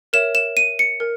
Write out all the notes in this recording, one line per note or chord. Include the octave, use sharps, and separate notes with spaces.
A#4 C#5 E5 E7
E7
D#7
C#7
A#4